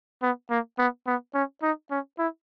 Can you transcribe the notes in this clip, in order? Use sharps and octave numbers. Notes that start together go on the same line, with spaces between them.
B3
A#3
B3
B3
C#4
D#4
C#4
E4